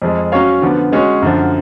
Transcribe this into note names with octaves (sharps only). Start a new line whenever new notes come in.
F2 F3 G#3
F#3 C#4 F#4 C#5 F5
D3 F3 B3
G#3 C#4 F#4 C#5
F#2 D3 F3